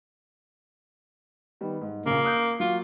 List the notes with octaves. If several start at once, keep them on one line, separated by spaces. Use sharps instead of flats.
D#3 G3 B3
G#2
A#1 C#3 A#3
D#6 F#6 G6
F#3 A#3 F4